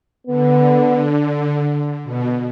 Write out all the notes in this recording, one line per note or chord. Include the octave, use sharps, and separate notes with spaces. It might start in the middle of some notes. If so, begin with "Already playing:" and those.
D3 B3
B2